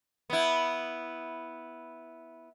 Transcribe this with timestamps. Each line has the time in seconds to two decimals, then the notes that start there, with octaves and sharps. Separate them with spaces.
0.30 B3 E4